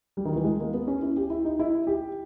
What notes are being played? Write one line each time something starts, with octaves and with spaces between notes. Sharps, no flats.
G3
D#3
E3
G#3
A#3
B3
C#4
E4
G4
E4
D#4
E4
G4